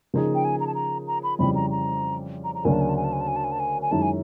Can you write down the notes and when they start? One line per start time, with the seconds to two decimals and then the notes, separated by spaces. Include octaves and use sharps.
0.14 C#3 F3 A#3 D#4 G#4
0.35 G5
0.45 G#5
0.60 A#5
0.67 A5
0.75 A#5
1.07 A#5
1.23 B5
1.39 F2 C#3 E3 G3 B5
1.55 A#5
1.71 A#5
2.44 A#5
2.55 A#5
2.65 D2 C#3 F#3 A#3 D4 G#5
2.73 A5
2.81 G#5
2.89 A5
2.96 G#5
3.04 A5
3.13 G#5
3.20 A5
3.28 G#5
3.36 A5
3.44 G#5
3.52 A5
3.60 G#5
3.82 G#5
3.91 F#2 D#3 G#3 C#4 E4 A5
4.02 G#5